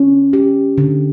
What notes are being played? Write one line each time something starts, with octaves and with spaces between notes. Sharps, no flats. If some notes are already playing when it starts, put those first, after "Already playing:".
Already playing: C#4
G4
D3